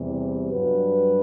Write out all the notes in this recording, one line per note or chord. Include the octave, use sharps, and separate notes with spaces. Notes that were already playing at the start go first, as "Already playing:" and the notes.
Already playing: E2 C3 G3
G2 F#3 B4